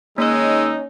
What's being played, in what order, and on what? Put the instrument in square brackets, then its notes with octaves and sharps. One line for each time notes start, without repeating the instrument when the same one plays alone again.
[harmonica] D#3 G#3 E6 [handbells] A#3 C#5 [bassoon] C#4 [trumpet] D#4